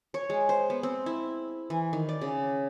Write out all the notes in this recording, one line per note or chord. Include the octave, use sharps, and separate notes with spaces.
C#5
G#3
C5
B3
C4
E4
E3
D#3
D5
C#3